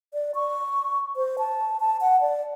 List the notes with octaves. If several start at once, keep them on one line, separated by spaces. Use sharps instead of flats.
D5
C#6
C5
A5
A5
F#5
D5